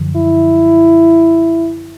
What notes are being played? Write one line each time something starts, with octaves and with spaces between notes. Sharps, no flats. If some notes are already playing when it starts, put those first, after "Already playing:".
Already playing: F#2 D3 F3
E4